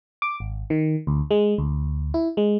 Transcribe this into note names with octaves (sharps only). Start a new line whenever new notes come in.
D6
G#1
D#3
D2
G#3
D2
E4
G#3